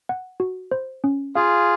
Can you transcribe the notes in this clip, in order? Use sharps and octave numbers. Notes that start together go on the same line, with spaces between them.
F#5
F#4
C5
C#4
F4 G#4 F5